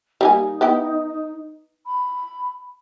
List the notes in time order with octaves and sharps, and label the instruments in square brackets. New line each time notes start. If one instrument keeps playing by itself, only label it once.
[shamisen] G3 A#3 G#5 [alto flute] D#4
[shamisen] B3 E4 G5
[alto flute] B5